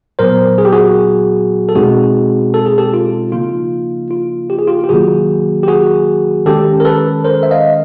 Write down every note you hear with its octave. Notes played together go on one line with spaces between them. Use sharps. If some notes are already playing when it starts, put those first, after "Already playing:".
A#2 F#3 B3 A#4 C5
G#4
G4
F#4 G#4
A4
B2 G#3 C4 D#4 F#4 G#4
A4
G#4
G4 A4
F4
C#3 F3 A#3 D#4 F4
F4
G4
G#4
F4 G4
G4
C3 D#3 F#3 A#3 F#4 G#4
G4
F#4 G#4
D#3 G#3 C#4 G4 A4
A#4
A4 B4
A#4 C5
E5
D#5 F5